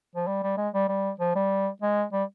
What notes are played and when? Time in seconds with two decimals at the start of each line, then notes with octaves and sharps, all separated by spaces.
0.16 F3
0.27 G3
0.43 G3
0.58 G#3
0.74 G3
0.89 G3
1.20 F3
1.36 G3
1.82 G#3
2.13 G3